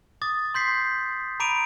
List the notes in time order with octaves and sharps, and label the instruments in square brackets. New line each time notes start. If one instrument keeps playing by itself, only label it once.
[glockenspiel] D6 D#6 A6
C6 G6 B6 C7
A#5 B5 D6 D7 D#7 F7